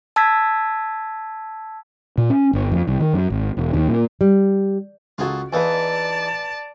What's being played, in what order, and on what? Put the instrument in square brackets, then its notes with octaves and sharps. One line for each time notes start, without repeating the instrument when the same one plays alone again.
[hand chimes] A5 E6 G#6 B6
[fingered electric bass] A#2
C#4
G1
F2
C2
D#3
F#2
G#1
E1
D#2
A#2
[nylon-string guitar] G3
[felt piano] C#2 F#4 [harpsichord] F4 G#4 A4
[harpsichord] E2 E3 D#4 [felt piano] B4 F5 G#5 [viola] D5 A5